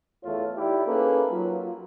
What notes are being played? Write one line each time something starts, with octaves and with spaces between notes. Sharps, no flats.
E2 A3 F4 C#5
D#4 E4 G4 D5
A#3 C#4 D#4 G#4 A4 B4
F#3 F4